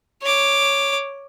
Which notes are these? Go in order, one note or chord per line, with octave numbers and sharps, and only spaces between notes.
C#5 D6